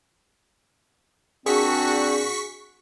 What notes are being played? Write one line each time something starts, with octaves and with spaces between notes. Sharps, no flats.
A#2 C4 D4 F#4 G#4 C#6 B6